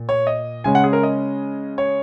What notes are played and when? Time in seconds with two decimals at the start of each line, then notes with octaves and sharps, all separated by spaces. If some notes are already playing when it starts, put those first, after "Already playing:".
Already playing: A#2
0.09 C#5
0.27 D#5
0.64 C#3 G#3 C#4 G#5
0.75 F#5
0.84 G#4
0.93 A#4
1.03 D#5
1.78 C#5